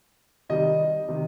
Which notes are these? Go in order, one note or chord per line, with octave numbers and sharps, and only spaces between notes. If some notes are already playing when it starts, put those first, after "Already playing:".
C3 D#3 G3 D#5
C3 D#3